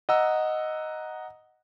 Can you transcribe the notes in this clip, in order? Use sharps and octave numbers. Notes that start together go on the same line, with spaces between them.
D#5 F#5 A#5 E6